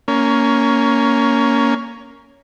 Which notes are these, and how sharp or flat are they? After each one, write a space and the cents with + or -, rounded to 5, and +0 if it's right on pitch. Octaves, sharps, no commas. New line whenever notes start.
A#3 +0 C#4 +15